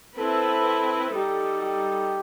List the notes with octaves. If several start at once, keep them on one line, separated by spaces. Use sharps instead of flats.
C4 E4 A4 B4
G3 D#4 G4 A4
G4